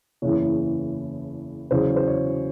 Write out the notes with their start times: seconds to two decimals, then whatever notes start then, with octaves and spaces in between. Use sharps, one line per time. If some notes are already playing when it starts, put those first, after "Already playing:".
0.22 F#1 E2 C#3 E3 C#5
1.71 E2 C#3 F#3 C5
1.96 C5
2.08 C#5